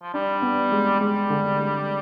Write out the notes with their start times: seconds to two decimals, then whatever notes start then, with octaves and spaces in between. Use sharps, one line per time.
0.02 F3
0.14 G3 D4
0.42 B3
0.72 G#3
1.00 G3 G#3
1.30 D3
1.59 G#3